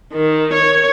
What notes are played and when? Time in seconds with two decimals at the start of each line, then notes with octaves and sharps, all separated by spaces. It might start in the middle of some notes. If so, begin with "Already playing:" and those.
0.12 D#3
0.53 C#5